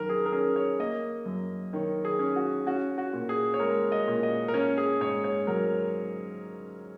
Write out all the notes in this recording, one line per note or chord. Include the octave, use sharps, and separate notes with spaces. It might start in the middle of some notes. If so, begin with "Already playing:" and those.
Already playing: F#2 D#3 A#4
G#4
A#4
C#4 G#4
C#5
A#3 D#5
F#2
D#3 C#5
G#4
C#4
F#4
C#4 F#4
F#4
A#2
G#4
C#5
G#3 A#4
D#5
A#2
D#5
A#4
C#4 C#5
G#4
G#2 C#5
C#5
F#3 A#4